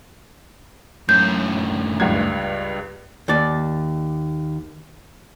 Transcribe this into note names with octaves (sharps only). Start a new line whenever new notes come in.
F#2 A2 G6
C#2 G2 G#6
D#2 D5